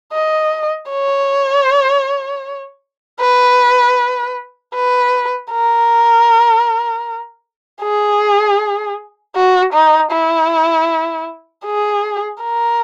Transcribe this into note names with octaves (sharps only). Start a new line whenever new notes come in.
D#5
C#5
B4
B4
A#4
G#4
F#4
D#4
E4
G#4
A#4